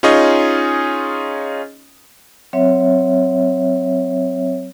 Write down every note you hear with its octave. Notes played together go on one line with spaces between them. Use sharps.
C#4 D#4 F4 G#4 C#5 D#5
F#3 C4 C#5 E5